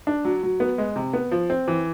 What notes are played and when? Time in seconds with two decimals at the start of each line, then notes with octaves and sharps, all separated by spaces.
0.07 D4
0.25 F#3
0.43 F#3
0.60 B3
0.78 G#3
0.96 C3
1.13 B3
1.31 F3
1.50 C4
1.68 E3